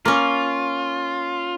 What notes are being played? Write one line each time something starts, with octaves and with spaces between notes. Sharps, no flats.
A#3 C#4 F4